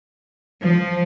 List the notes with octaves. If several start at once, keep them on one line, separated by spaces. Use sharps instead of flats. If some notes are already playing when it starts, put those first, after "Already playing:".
F3